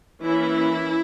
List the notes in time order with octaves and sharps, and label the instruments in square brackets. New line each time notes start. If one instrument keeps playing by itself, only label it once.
[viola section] E3 A#3 C#4 E4